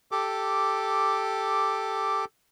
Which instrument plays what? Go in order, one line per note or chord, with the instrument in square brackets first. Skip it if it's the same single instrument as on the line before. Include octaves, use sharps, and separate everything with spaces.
[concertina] G4 A4 D6